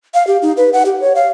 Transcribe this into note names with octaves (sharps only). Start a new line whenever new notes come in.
F5
G4
D#4
B4
F#5
G4
C#5
F5